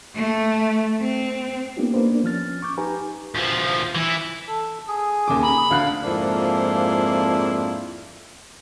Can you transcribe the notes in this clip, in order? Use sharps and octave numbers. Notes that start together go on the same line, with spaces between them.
A3
C4
A#3 B3 C#4 D#4 F4 G4
A#3 B3 D4 B4 C5
A#3 D4
F3 C#4 F6 A6
C#6 D6 G6
D#4 G4 B4 G#5 A#5
D2 F3
E3 E4
A4
G#4
D#2 C#3 D6
A#5 B5
D2 D3 F5 F#6
F2 G#2 A#3 D4 E4 F4